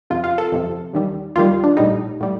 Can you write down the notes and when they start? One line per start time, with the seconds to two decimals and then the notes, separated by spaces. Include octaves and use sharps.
0.10 F2 C3 F3 F4
0.24 F4
0.38 A4
0.52 F2 C3 F3
0.93 D#2 D#3 G3
1.36 D#2 D#3 G3 F4
1.64 D4
1.77 A#1 A2 G3 D#4
2.21 A2 G3